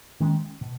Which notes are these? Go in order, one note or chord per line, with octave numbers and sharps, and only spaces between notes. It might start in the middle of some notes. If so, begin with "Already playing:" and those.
D#3 G#3 C#4
B2